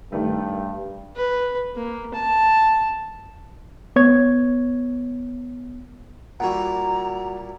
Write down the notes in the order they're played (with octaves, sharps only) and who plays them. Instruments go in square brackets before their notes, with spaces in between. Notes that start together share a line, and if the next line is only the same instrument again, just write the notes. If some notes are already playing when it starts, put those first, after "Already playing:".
[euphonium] G2 [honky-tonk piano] D#3 A3
[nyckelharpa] B4
A#3
A5
[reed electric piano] B3 C#5 G#6
[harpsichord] A#2 G3 E4 [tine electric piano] F#4 F#5 [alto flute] A#5